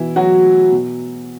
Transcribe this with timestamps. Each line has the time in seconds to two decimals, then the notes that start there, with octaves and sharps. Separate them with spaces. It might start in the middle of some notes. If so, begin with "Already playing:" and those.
Already playing: B2 E3 E4
0.16 F#3 F#4
0.72 B2